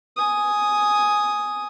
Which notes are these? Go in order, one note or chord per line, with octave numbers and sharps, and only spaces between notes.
G#5 D#6